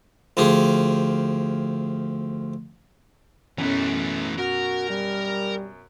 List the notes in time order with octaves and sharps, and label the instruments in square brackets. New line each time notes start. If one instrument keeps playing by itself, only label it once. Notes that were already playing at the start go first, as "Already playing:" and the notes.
[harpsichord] D2 F3 G4 G#4
[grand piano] F#2 B2 C#4 [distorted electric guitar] E3 A3
[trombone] F#4 [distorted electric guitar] A#4
[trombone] G3